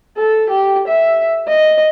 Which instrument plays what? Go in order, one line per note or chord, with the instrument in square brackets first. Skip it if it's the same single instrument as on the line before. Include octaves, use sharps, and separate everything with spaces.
[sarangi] A4
G4
E5
D#5